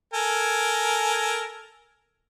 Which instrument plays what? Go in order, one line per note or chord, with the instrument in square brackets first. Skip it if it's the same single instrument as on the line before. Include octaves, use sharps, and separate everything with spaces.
[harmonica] A4 A#4 G#5